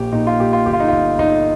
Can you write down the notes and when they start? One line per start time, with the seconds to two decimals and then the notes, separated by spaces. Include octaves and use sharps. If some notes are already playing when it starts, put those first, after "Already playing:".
Already playing: A#1 A#2 G4
0.12 A#2 D#4
0.27 F4
0.39 A#2 G4
0.53 F4
0.66 G1 G4
0.73 F4
0.80 D#4
0.88 G1 F4
1.18 G1 D#4